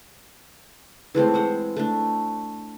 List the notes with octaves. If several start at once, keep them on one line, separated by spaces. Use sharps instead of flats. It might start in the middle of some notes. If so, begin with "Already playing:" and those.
E3 G#3 A3 C4
G#3 C5 F#5
A3 D4